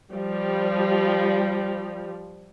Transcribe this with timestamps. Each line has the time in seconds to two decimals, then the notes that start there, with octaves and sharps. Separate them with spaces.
0.13 F3 G3